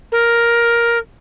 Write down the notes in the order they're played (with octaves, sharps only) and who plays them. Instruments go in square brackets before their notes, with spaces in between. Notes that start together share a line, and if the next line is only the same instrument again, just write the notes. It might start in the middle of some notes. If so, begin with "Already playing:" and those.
[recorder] A#4